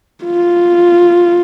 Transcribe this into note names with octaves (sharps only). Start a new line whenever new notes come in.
F4